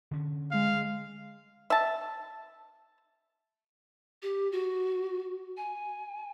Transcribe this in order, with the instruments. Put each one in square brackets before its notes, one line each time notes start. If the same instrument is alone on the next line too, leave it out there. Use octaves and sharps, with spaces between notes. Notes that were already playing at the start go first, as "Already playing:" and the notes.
[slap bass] D3 C#4
[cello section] G#3 [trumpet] F5
[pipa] E5 A5
[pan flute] G4
F#4
G#5